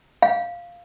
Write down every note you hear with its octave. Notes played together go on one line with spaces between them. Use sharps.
F5